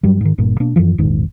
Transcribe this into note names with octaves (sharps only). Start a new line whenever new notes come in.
G2 F#3 G3
G#2 D#3
G1 G2 A#2
B2 A#3 D4
F#2 A2 E3 F3
E1 A#1 G#2 D#3